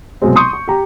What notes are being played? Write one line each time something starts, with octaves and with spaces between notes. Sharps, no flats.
C2 B2 F#3 G#3 C4
C6 C#6 D#6 G6 C#7
C#6
G4 A#5